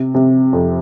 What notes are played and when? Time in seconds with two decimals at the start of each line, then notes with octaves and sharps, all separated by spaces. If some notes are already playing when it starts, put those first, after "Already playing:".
Already playing: C3
0.14 C3
0.53 F2